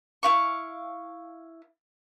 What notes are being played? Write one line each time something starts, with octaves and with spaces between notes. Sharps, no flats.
E4 F5 C#6